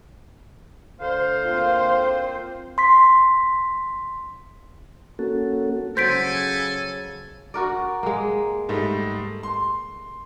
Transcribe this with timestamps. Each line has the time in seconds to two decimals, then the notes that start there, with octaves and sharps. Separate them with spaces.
1.00 D2 C5 F5
1.44 A#3 C4 F4
2.78 C6 B6
5.19 A#3 C#4 F#4 A4
5.97 C#3 F#3 A4 C5 G#5 G6 B6 D7
7.54 F#4 A#4 D5
8.03 G#3 A#3
8.69 G#2 G3 A3
9.43 C6